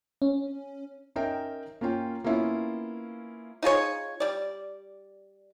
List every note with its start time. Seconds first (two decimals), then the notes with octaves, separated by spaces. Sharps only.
0.22 C#4
1.16 C#4 D#4 A#4 E5 G5
1.81 A#3 C#4 F4 G5
2.24 A#3 B3 C#4 E4 F4
3.63 D#4 F4 G#4 C#5
4.20 G3 D5